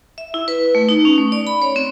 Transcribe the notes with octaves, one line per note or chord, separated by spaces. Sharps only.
E5
E4
B4
A3
D#4
C#4
A3
D5
B5
C#5
C4